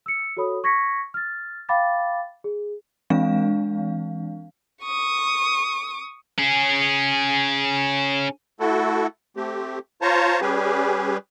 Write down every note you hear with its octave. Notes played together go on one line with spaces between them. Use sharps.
E6 C#7
F#4 A4 C#5 B5 D#6
C#6 G#6 A#6 B6 C#7
F6 A6
F5 G5 B5 D6 A6
G#4
E3 G#3 C4 D4 F5
C#6 D#6
C#4 G#4
A3 E4 F#4 A4
A3 C4 G4
F4 C5 C#5 A5 A#5
G3 C#4 G4 G#4 B4